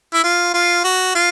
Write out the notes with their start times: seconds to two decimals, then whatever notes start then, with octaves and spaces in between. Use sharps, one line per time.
0.14 E4
0.24 F4
0.54 F4
0.84 F#4
1.15 F4